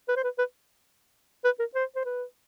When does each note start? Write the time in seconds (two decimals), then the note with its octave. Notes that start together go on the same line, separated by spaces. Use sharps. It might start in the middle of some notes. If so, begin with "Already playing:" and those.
0.09 B4
0.16 C5
0.24 B4
0.39 B4
1.45 B4
1.59 A#4
1.75 C5
1.96 C5
2.05 B4